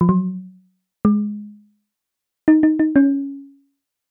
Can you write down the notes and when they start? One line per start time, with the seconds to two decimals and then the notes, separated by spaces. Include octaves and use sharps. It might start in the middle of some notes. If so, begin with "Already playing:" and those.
0.01 F3
0.09 F#3
1.05 G#3
2.48 D#4
2.63 D#4
2.79 D#4
2.96 C#4